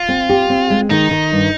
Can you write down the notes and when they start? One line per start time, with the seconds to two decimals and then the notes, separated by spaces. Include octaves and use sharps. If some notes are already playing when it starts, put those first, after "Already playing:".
Already playing: F4
0.09 C4
0.29 G4
0.50 C4
0.70 G#3
0.90 D#3 D#4
1.11 D#3
1.32 G2